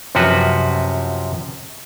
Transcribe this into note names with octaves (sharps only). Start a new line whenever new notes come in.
F#2 C3 F3 F#4 B4